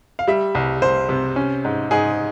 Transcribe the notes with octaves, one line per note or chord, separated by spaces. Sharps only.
F5
G3 E5
C2
C2 C5
C3
C#4
G#2
G#2 G#4